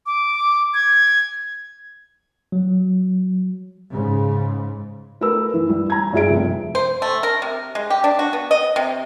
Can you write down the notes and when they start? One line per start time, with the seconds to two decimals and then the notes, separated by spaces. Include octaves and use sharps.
0.06 D6
0.74 G#6
2.52 F#3
3.91 G#2 C#3
5.21 A3 A#4 B4 E6
5.54 E3
5.69 G3
5.90 A#5 G#6
6.13 G2 F4 G#4 E5 D7
6.30 F1
6.75 C5
7.02 A3
7.23 A#4
7.42 C3
7.75 G#3
7.90 G4
8.04 D4
8.19 F#4
8.33 B3
8.51 D#5
8.76 C3